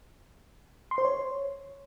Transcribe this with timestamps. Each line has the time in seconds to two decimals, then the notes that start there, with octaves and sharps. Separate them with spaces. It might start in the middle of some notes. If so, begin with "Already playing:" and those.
0.91 C6
0.98 C5
1.05 C#5